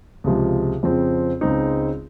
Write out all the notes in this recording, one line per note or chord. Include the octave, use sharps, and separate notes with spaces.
C#2 C3 F3 G#3
F2 C#3 F3 C4
C#2 C#3 G#3 C4 D#4